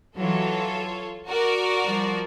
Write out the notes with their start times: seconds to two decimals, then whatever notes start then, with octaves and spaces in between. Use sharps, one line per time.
0.18 E3 F#3 F4 A4 C#5
1.28 F#4 A#4 D5
1.84 F3 G3